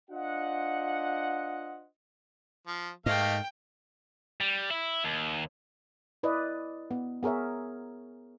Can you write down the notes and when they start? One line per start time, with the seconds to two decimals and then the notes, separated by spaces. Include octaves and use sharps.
0.10 D4 F4 C5 D#5 F#5
2.67 F3
3.06 G#2 A3 A#3 D#5 F5 G5
4.41 G3
4.71 E4
5.04 D#2
6.23 E4 B4 D5 D#5
6.91 B3
7.23 B3 G#4 A#4 C#5 E5